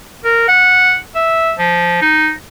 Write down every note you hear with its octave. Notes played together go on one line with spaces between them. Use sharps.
A#4
F#5
E5
F3
D#4